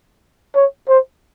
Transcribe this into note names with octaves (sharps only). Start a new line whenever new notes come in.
C#5
C5